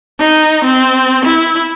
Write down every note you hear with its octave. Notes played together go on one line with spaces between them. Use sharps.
D#4
C4
E4